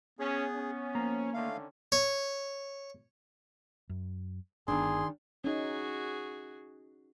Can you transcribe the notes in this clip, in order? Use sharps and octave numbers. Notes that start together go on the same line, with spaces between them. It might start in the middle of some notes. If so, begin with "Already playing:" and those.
B3 C#4 G#4
C#4
F3 A#3 A#5
D3 D#3 A3 C#4 F5
C#5
F#2
G1 D#3 B3 D4 G#4 C6
C#4 D#4 F#4 G#4